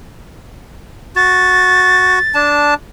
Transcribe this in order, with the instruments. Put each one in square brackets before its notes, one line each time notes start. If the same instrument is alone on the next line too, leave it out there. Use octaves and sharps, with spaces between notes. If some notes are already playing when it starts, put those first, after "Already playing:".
[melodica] F#4 [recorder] A6
[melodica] D4 A5